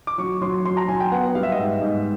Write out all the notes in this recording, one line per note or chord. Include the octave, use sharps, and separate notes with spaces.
D6
F#3 C#6
F#3 C6
F#3 C6
A#5
F#3 G#5
G5
B3 F#5
G3 F5
E5
D#5
G#2 E5
G#2